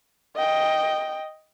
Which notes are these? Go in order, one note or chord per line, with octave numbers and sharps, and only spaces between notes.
D#5 G5